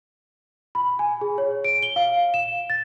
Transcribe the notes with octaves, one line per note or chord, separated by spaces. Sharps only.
B5
G#5
G#4
C#5
D7
G7
F5
E7
A6